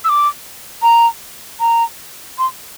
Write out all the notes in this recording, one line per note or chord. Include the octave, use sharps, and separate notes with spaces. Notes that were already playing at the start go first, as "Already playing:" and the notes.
E6
D6
A#5
A#5
C6